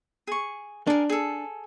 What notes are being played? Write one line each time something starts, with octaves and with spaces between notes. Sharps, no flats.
G#4 C#6
D4 G#4 A#4
G#4 A4